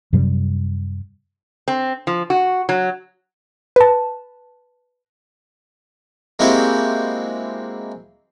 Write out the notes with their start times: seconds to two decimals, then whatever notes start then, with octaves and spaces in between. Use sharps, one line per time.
0.13 F#2 C3 F#3 G3
1.68 C4
2.07 F3
2.30 F#4
2.69 F#3
3.76 B4 A5
6.39 G#3 A#3 C4 E4 F#4 G4